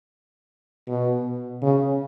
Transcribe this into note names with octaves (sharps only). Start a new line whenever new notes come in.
B2
C#3